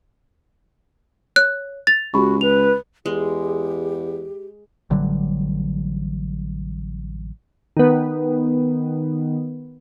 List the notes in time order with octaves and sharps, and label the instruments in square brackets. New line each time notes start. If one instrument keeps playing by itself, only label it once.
[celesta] C#5 [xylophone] F#6
[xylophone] A6 [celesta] F7
[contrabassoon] C#2 [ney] F#4 [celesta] G4 B5 C#6
[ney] B4 [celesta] F7
[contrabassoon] E2 [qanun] G#3 [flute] G4
[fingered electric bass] A1 D3 F#3 G3
[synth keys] D#3 B3